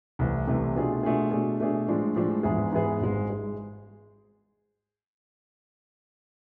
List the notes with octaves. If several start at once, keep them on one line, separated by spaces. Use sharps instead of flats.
C2 C3 E3 A3
C2 C3 E3 A3
B2 A3 D4 F4 G#4
B2 A3 D4 F4 G#4
B2 A3 D4 G#4
B2 A3 D4 G#4
A2 F3 G#3 D4
A2 F3 G#3 D4
G#2 E3 B3 E4 G#4
G#2 E3 B3 E4 G#4
G#1 G#2 G#3
G#3